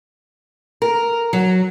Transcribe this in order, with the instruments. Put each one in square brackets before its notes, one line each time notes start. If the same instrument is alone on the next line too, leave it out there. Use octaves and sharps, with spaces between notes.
[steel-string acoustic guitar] A#4
F#3